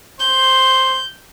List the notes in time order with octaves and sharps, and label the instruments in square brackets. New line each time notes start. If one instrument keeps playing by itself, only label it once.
[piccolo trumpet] C5 [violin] G6